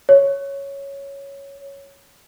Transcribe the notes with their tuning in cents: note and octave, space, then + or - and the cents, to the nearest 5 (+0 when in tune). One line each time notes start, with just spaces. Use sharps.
C#5 +0